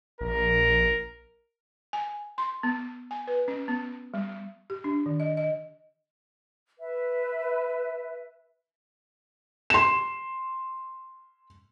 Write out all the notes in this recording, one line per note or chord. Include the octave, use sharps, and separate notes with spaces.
A#1 A#4
G#5
C6
B3
G#5
B4
C#4
B3
G3
G4
D4
D#3
D#5
D#5
B4 E5
C6 E7